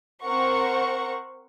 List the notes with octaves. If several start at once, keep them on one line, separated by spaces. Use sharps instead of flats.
C4 A#4 C5 F#5 C#6